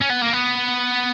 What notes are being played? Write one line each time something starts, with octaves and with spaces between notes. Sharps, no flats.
C#4
B3
A#3
B3